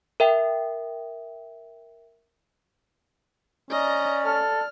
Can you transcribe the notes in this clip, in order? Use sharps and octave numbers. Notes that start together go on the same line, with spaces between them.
A#4 E5 G5
C#4 D5 D#5 A#5
A4 F6